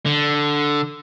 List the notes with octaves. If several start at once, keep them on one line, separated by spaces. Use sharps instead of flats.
D3